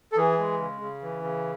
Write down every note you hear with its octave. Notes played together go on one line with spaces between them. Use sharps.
A4
E3 G#4
G#3
C#3
C#3
E3
C#3